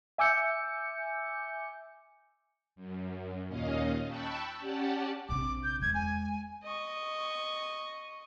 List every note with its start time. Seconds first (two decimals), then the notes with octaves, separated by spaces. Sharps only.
0.18 E5 G#5 D6 E6 G6 C#7
2.76 F#2
3.49 D#2 A#2 C#4 D#5 F5
4.07 G5 A5 B5 C#6 E6 F#6
4.59 C#4 G4 D5 F#5 A5
5.29 A#1 C3 D6
5.64 G6
5.82 E2 G#3 G#6
5.94 G#5
6.64 D#5 C#6